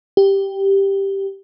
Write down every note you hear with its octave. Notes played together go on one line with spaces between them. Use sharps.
G4